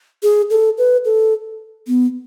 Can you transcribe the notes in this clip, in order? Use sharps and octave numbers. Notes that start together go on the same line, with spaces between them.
G#4
A4
B4
A4
B3